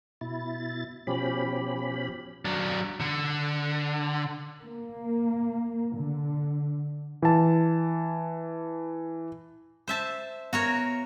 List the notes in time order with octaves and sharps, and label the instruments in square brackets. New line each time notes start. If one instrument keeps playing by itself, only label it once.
[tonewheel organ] B2 E4 A6
B2 F3 C#4 G4 B5
[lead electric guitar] F#3 D4
D3
[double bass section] A#3
D3
[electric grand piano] E3 A5
[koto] C5 E5 A5
[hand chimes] B3 [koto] F#4 A#4 C#5